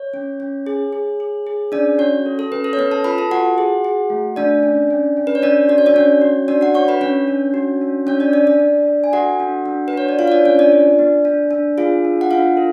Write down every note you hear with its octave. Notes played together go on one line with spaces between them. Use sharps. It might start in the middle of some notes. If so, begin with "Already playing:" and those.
Already playing: C#5
C#4
C#4
G#4
G#4
G#4
G#4
C#4 D4 D5
C#4 F#4 C#5
A4
A4
C#4 B4
A4
C#5
B3 B4
A4 A5
F4 B4 B5
A4 A5
F4 F#4 F#5
G#4
G#4
A3
A3 D4 D5
C#4
C#4
C#4
B4
C#5
C#4 D4 D5
F#4 D5
C#5
D4 D5
C#4 F#4 C#5
F#4
D4 F#4 D5
F#4 F#5
D4 C#5 C#6
B4 B5
C#4 D4 C#5
D4
F#4
D4
C#4 D4 C#5
D4 D5
D4 D5
D4 D5
D4
D4
G#5
F#4 A4 F#5
D4
D4
B4
D4 C#5
D5
F4 F5
C#5
D4 D5
C#4 F4 C#5
D4 D5
F4
B3
D4
D4
F4 G#4 F5
D4
F#5
D4 F4 F5
A4